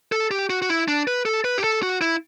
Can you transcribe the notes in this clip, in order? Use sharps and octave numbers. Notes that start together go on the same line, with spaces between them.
A4
G4
F#4
F#4
E4
D4
B4
A4
B4
G4
A4
F#4
E4